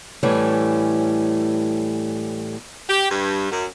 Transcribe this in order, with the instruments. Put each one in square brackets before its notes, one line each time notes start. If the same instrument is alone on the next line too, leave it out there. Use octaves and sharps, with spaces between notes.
[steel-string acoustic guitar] A2 E3 G3 A3 C#4
[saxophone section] G4
G2
F#2